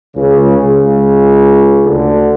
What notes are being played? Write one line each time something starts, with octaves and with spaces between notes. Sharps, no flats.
C#2 C#3
C#2 C#3
D2 D3